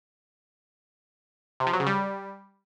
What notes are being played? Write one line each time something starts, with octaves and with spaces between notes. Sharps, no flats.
C3
F3
F#3
C#3
G3